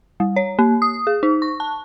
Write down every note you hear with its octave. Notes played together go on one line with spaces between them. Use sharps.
G3
C#5
A#3
D#6
G#4
D#4
C#6
A5